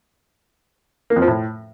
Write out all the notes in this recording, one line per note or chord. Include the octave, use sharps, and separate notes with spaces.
A#3
F2
F3
A2